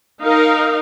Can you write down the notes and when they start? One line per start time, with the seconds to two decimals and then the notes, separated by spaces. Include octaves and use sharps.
0.22 D#4 A#4 F5